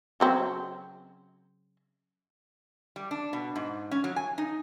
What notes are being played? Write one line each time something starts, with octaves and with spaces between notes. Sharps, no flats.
C#3 F#3 C4
G3
D4
B2
G#2
C#4
F#3
G#5
D#4